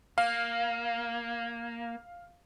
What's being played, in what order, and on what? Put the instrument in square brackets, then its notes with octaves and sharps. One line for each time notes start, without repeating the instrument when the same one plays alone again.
[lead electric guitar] A#3 [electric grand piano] F5